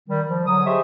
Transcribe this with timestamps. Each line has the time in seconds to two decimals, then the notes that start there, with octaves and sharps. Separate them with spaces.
0.09 D#3 G3
0.28 F3
0.46 D3 F#3 D#6
0.66 G4 G#4 C5 D#5 E5 C#6